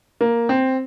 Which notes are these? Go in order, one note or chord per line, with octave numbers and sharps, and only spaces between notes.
A#3
C4